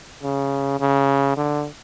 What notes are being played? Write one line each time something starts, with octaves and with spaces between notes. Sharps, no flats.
C#3
C#3
D3